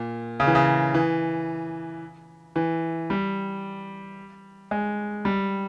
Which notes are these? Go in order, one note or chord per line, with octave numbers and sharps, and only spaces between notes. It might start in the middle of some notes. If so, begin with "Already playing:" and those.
Already playing: A#2
C#3
E3
C#3
E3
E3
G3
G#3
G3